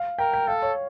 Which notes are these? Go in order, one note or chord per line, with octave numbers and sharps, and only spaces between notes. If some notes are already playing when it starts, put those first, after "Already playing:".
Already playing: F5
A#4 G5
G5
A4 F5
C#5